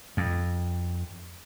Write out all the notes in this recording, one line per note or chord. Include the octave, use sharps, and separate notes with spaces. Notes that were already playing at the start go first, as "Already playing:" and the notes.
F2